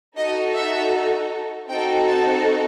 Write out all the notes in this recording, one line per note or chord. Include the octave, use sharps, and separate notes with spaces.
D#4 F#4 A4 D#5
E5
C4 D#4 F#4 A4 G5
A5